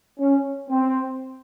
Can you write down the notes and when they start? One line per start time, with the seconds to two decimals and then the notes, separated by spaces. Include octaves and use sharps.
0.18 C#4
0.69 C4